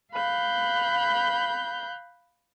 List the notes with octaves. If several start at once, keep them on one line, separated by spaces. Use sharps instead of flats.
F5 B5 F#6 G6